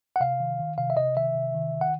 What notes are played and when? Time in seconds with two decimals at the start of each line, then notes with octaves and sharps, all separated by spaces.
0.16 F#5
0.20 C3 F5
0.40 D#3
0.59 D#3
0.78 C3 F5
0.90 E5
0.97 C3 D#5
1.16 D#3 E5
1.35 C3
1.55 D#3
1.74 D#3
1.81 F#5